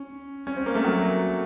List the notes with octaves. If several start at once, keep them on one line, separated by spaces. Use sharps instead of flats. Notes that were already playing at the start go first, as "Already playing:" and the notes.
Already playing: C#4
C#4
C4
A#3
A3
F#3